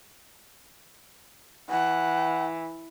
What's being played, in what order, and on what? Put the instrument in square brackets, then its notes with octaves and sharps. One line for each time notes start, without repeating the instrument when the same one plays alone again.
[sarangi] E3 [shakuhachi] F#5